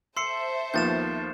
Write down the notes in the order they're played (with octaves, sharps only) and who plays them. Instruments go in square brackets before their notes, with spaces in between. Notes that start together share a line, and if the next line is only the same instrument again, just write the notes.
[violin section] A4 C5 E5 [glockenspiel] C6 C7 C#7 [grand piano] E6
[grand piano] D#2 F3 B3 [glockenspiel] G6 A6 E7